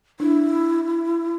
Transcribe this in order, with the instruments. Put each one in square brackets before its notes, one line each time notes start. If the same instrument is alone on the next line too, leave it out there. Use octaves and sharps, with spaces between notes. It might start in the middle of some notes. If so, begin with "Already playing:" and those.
[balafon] D4 [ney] E4